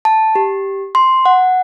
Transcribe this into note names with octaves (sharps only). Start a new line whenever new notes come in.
A5
G4
C6
F#5